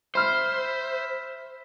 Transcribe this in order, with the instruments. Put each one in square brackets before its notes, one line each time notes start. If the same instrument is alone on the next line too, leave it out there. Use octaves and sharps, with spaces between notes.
[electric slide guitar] C5 [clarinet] E5 [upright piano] B5 F6